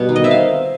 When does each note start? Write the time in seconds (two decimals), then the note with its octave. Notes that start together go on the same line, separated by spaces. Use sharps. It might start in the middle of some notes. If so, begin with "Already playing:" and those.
Already playing: B2 G3 B3
0.09 D#3
0.16 D#5
0.24 C4 E5
0.31 F5